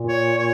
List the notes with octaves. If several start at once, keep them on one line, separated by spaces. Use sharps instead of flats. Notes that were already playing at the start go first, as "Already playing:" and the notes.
Already playing: A#2
C#5
C#5